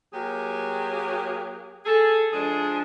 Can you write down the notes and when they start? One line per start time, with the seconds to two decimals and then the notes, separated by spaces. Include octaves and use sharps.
0.12 F#3 A#3 G4 G#4
1.86 G#4 A4
2.33 F3 G#3 D4 G#4